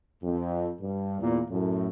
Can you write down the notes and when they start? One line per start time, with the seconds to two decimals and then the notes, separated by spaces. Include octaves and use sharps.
0.24 F2
0.81 G2
1.20 E2 A#2
1.50 F#2 A2